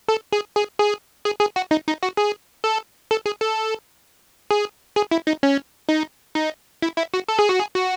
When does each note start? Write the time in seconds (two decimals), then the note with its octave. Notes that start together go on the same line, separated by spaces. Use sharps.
0.08 A4
0.32 G#4
0.56 G#4
0.79 G#4
1.25 G#4
1.41 G#4
1.56 F#4
1.71 D#4
1.87 D#4
2.03 F#4
2.17 G#4
2.64 A4
3.11 A4
3.26 G#4
3.41 A4
4.51 G#4
4.96 G#4
5.11 E4
5.27 D#4
5.43 C#4
5.89 D#4
6.35 D#4
6.82 E4
6.98 E4
7.14 F#4
7.29 A4
7.39 G#4
7.49 F#4
7.59 G#4
7.75 F#4